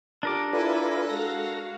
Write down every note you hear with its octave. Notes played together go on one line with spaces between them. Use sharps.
D4 F4 G4 A4 A#4 D6 D#6
E4 F4 A4 B4 D5 G#5
G#3 F#4 F5 A#6